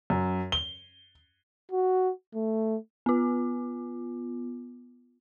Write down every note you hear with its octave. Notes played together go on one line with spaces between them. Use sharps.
F#2
G7
F#4
A3
B3 F4